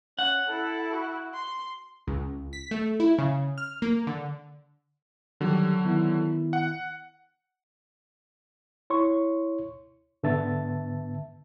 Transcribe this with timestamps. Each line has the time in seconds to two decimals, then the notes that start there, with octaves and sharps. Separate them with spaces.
0.19 C#4 F#5
0.48 E4 A4
0.92 F#4
1.34 C6
2.07 C#2
2.53 B6
2.71 A3
3.00 E4
3.18 C#3
3.58 F6
3.82 A#3
4.07 D3
5.41 D3 D#3 F#3 G3 G4
5.85 D#3 B3 E4
6.53 F#5
8.90 E4 C#5 C6 C#6
10.23 G#2 D3 B3 E5 A5 A6